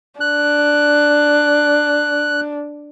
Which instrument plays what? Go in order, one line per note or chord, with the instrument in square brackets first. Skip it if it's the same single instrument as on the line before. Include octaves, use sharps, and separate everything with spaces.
[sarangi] D4 [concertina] F#6